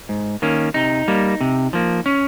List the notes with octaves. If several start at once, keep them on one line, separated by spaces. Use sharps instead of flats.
G#2
D#3 A#3 C#4
C3 D#4
G3 A#3
C3
F3 A#3
C#4